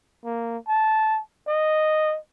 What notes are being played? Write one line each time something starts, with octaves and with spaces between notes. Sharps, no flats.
A#3
A5
D#5